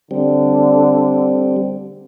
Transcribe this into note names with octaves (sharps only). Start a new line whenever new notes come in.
D3 G3 C4